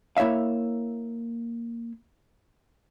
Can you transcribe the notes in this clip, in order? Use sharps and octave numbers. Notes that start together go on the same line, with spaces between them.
A#3 E4 C#5 E5 F5